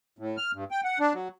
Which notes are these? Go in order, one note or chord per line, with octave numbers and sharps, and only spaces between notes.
A2
F6
G2
G5
F#5
D4
F#3